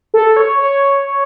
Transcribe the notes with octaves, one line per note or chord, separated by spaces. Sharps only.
A4
C#5
C#5